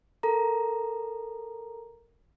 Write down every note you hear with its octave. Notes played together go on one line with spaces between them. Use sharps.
A4 A#4 A#5